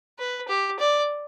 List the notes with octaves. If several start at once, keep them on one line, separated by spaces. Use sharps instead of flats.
B4
G4
D5